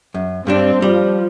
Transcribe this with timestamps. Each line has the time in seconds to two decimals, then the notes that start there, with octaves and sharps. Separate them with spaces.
0.14 F#2
0.47 G2 G3 C4 D4
0.82 F3 G3